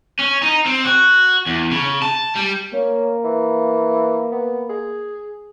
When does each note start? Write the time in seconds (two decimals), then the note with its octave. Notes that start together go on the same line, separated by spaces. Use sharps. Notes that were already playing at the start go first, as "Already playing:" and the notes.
0.19 C#4
0.42 D#4
0.66 C4
0.85 F#4
1.46 E2
1.71 C#3
2.02 A5
2.35 G3
2.73 A#3 C#4
3.24 E3
4.32 B3
4.69 G#4